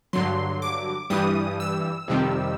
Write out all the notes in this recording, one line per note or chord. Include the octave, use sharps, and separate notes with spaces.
G2 D3 F#3 C6
D6
G2 E3 G3 D#6
E6
F2 C3 D#3 G3